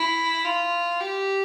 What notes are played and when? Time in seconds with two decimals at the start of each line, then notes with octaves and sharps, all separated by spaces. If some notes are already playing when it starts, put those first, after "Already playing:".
Already playing: E4
0.45 F4
1.00 G4